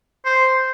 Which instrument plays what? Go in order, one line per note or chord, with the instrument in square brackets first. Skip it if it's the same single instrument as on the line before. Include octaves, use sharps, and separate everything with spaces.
[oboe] C5